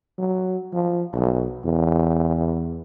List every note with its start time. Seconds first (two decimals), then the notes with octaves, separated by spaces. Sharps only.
0.18 F#3
0.72 F3
1.14 B1
1.64 E2